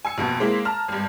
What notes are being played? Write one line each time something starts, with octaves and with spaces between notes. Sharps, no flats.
G#5 E6 C#7
A#1 F2 B2
G#3 A#3 C4 E4
A5 A#5 F6
G#1 G2